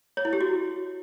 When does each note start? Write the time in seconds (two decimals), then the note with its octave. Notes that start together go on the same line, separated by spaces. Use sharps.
0.17 C#5
0.25 E4
0.33 G4
0.41 F#4